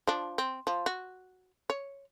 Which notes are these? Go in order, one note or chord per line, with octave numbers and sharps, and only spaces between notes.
F3 D4
C4
F3
F#4
C#5